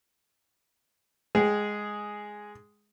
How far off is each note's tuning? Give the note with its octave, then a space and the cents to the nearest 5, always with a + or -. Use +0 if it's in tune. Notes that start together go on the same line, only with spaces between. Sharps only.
G#3 +0 G#4 +0 G5 -25